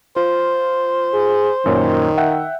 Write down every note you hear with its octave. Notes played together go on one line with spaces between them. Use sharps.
F4 C5
G#4
F#2 A#2 D#3 C#5
E5 F#5 G5